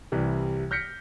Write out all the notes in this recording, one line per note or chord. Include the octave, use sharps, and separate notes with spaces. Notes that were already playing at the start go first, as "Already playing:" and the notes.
C2 E3 G3
F6 G6 A#6 B6 C#7